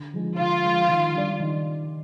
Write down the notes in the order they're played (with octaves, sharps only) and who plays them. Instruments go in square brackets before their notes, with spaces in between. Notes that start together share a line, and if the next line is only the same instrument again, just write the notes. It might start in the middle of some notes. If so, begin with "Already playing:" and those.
Already playing: [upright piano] D3
F3 G#3
[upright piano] D3 [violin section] F4
[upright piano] F3 G#3
D#3
G3 D4 G4 D5
D#3